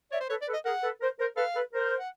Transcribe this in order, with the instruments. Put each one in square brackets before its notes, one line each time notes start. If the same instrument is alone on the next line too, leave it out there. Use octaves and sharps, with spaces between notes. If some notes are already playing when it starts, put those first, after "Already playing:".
[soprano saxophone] C#5 [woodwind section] D5 E5
[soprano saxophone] C5
[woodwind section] A4 B4 [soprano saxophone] C#5
[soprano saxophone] D5
[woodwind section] A4 B4
[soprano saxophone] D#5
[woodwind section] G#4 A#4 [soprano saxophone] F#5
[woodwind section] A4 B4
A#4 C5
A#4 C5
[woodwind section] A4 B4 [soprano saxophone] F5
[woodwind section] A4 B4
A#4 C5
[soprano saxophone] F#5